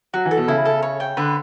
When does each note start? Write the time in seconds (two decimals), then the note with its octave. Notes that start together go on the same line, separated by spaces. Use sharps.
0.14 F#3 F#4
0.25 E3
0.31 A4
0.37 B2
0.48 C#3 E4
0.65 A4
0.83 C#5
1.00 G5
1.17 D3 B4